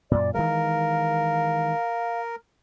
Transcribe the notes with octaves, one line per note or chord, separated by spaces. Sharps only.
F#2 A#2 D5
D#3 E3 G#3 A#4 F5